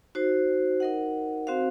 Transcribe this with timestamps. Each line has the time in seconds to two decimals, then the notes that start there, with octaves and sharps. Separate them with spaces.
0.15 D#4 F#4 C5
0.80 D#4 A#4 D#5 F#5
1.47 C4 F#4 C5 F5